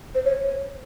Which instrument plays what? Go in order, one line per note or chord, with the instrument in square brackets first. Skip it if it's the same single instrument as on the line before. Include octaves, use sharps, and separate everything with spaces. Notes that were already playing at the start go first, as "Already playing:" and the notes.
[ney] C5
C#5